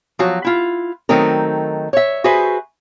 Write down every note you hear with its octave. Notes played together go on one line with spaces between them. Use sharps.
F3 F#3 F#4
E4 F4
D#3 F#3 A3 C4 D#4 A#4
C#5 E5
F#4 G#4 B4 C5 E5